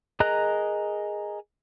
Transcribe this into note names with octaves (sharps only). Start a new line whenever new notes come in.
G#4 A#4 D#5 A#5 F#6